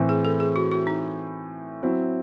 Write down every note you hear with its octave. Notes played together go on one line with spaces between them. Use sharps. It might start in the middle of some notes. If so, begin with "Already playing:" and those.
Already playing: A2 E3 C4
G#4
A4
G#4
F#4
F#4
D#4
F#3 C4 E4